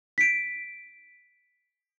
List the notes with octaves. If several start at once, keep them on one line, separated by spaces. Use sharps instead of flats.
B6 D7